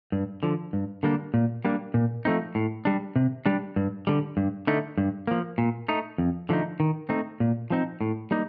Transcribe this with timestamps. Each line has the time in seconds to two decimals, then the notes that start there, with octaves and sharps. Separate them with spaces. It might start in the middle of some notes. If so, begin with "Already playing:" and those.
0.12 G2
0.43 D3 F3
0.73 G2
1.03 D3 G3 A#3 D4
1.34 A#2
1.65 G3 A#3 D4
1.94 A#2
2.25 F3 A3 C4 D#4
2.55 A2
2.85 G3 D4
3.16 C3
3.46 G3 D4
3.76 G2
4.07 D3 G3
4.37 G2
4.67 D3 A3 D#4
4.98 G2
5.27 F3 A#3
5.58 A#2
5.88 A3 D#4
6.18 F2
6.49 D3 F3 A3 D#4
6.80 D#3
7.09 A3 C4 D#4
7.40 A#2
7.70 F3 C4 D#4
8.01 A2
8.31 G3 A#3 D#4